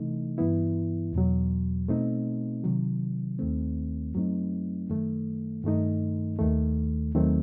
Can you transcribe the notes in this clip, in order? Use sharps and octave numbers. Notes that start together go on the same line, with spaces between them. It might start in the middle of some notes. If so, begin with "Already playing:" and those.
Already playing: C3 E3 A3 D#4
G2 E3 B3 E4
E2 B2 F#3
B2 A3 C4 D#4
C3 D#3 F#3
D#2 D#3 A3 C4
F#2 F#3 A3 C4 D#4
F#2 D#3 A3
G2 D#3 A3 D#4
D#2 D#3 A3
D#2 D#3 F#3 A3 C4